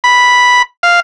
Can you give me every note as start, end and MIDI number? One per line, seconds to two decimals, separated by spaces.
0.04 0.62 83
0.83 1.00 77